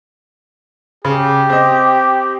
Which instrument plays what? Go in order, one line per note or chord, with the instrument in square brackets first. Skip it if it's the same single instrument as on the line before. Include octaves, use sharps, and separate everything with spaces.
[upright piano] C#3 [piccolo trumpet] G4
[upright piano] C4 D#5